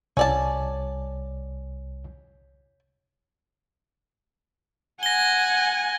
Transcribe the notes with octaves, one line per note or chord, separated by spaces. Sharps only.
C2 C#4 D5 A5
F#5 G#5 A#6 G7